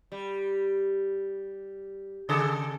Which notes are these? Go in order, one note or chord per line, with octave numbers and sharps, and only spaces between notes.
G3
C#3 G#4 A4